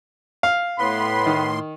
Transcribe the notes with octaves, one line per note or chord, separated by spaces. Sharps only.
F5
A2 B3 B5 C6
D#3